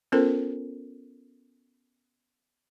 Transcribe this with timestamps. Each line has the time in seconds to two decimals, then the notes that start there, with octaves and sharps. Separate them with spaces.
0.12 B3 C#4 F4 A4 A#4 C5